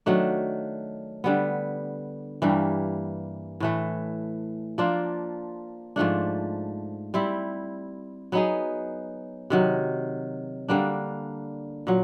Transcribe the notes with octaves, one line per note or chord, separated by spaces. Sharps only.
D#3 F#3 A3 D4
D3 G3 B3
G2 E3 G3 A#3
A2 E3 A3
F3 A#3 D4 F4
G#2 F3 A3 D4
G3 C4 E4
F#3 B3 D#4 G#4
C3 D#3 F#3
D3 G3 A#3 D4
A#2 F#3